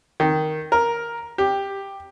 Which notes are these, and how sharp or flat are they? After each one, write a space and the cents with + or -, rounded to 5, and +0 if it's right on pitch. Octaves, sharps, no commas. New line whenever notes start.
D#3 +0
A#4 +5
G4 +10